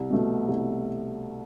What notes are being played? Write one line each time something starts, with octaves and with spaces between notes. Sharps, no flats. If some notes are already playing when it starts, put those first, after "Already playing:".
Already playing: C2
B2 A3
C2